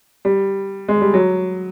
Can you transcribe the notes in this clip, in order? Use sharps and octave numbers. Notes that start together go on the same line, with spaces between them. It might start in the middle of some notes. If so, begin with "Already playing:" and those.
G3
G#3
G3
F#3